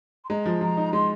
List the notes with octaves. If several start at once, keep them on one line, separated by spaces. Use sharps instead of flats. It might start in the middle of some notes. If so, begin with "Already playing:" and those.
C6
G#3 A#5
F3
F3 A#5
D#4
G#3 C6